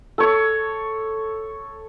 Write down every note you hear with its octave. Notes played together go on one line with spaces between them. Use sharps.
A4 C#5